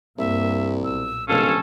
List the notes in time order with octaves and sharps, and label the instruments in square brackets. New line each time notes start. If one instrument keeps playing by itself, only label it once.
[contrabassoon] C2 [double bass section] G2 G3 A#3 [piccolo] E5
[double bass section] B1 A#2 [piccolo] E6
[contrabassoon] D1 [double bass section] A2 C3 F3 [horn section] G#3 C#4 A4 [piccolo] F5